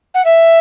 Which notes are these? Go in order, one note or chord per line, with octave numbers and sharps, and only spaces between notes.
F#5
E5